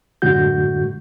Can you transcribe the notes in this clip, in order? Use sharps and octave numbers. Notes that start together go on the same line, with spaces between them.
F#2 A2 D3 G#3 F#4 G6